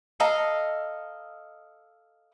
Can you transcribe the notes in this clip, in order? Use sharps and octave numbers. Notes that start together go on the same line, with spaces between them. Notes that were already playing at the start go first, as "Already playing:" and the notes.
A4 D#5 F5 A#5